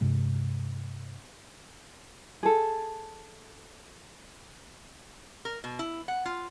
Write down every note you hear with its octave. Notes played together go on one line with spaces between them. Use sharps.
G2 C3 G#3
G#4 A4
A#4
B2
E4
F#5
F4